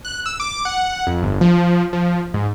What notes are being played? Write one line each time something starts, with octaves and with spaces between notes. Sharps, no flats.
F#6
E6
D6
F#5
F2
G1
F3
F3
G#2